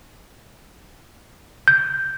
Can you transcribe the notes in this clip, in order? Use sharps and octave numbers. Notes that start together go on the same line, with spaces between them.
G6